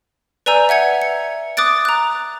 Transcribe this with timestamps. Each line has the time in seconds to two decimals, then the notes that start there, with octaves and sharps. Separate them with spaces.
0.46 B4 D5 G#5 A#5 E6 G6
0.69 E5 F#5 G#6 C#7
1.02 C#7
1.57 D6 D#6 F#6 A6 D7
1.85 A#5 F#6